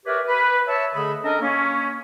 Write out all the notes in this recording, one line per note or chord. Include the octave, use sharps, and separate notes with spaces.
G4 A#4 B4 C#5 D5 E5
B4
C#5 E5 A5
D3 A3 G#4 D#5 B5
C#4 D4 A4 A#4 D#5
A#3 C#4